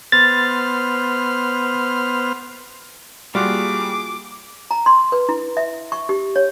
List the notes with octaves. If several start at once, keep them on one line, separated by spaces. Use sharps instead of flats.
B3 C5 F6 A6
G3 A#3 F4 F#4 G#4 D6
A#5
C6
B4
E4
E5
C#6
G4
C#5